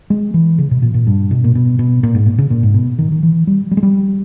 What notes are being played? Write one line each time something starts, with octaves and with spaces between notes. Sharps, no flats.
G#3
E3
C#3
B2
A#2
A#2
G2
B2
A#2
B2
B2
A#2
G#2
A#2
C#3
A#2
G#2
B2
D#3
D#3
E3
G3
G3
G#3
G3